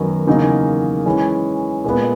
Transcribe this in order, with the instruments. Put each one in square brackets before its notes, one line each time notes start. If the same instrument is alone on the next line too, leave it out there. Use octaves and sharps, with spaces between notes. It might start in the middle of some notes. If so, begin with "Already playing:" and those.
Already playing: [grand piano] F#2 D#3 F#3 B3 D#4
E2 C#3 F#3 A#3 D#4
E3 G#3 C#4
A#2 G#3 B3